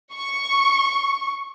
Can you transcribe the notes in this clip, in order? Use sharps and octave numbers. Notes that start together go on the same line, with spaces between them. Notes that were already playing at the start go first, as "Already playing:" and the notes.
C#6